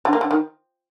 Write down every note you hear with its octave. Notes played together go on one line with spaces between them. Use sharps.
D3
A#3
D3
D#3